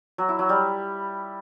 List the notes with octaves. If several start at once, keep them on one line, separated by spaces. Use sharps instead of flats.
F#3
E4
F#3
G3